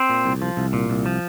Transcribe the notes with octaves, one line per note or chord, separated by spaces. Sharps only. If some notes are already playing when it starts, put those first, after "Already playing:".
Already playing: C4
A#2
C2
F3
C2
A#2
C2
F3